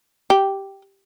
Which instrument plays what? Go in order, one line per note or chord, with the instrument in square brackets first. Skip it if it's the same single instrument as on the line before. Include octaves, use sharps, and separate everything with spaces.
[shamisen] G4